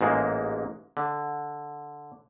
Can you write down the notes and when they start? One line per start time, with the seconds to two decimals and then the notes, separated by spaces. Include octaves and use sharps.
0.01 A1 G#2 G#3 A#3
0.97 D3